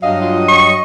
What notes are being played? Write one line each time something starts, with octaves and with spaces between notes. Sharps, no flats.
G2 F#3 D#5 F5
F4
C#6